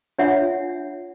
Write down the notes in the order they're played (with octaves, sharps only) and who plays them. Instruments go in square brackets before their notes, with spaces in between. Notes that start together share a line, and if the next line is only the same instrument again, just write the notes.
[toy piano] D4 F4 C#5 E5 F#5 G#5